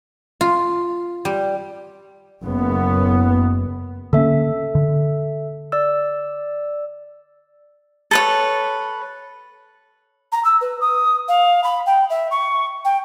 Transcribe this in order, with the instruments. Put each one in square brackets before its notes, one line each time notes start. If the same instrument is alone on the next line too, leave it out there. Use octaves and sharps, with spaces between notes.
[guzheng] F4
G3
[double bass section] F#1 F#2 B3
[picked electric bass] D3 A#3 C#4 [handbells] A4 E5
[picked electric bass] D3
[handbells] D5 E6
[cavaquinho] A4 B4 C#5
[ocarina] A#5
E6
B4
D#6
F5
B5
G5
E5
C#6
G5